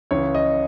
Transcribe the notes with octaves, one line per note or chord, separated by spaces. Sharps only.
C#2 C#3 E3 C#5
D#5